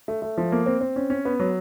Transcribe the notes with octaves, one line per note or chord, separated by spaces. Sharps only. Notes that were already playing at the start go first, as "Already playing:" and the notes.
A3
A3
F3
A#3
C4
C4
C#4
C#4
B3
F#3